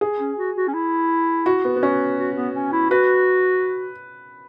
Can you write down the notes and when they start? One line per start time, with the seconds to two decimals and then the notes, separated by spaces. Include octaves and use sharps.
0.01 G#4
0.20 C#4
0.38 F#4
0.56 F#4
0.68 C#4
0.74 E4
1.46 F#4
1.65 B3
1.76 B3
1.83 C#4
2.18 F#4
2.36 B3
2.55 C#4
2.73 E4
2.90 F#4 B4